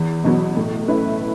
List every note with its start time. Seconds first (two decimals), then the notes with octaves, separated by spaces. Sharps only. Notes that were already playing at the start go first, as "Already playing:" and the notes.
Already playing: E2
0.24 B2 F#3 B3
0.57 A2
0.88 A3 C#4 E4 B4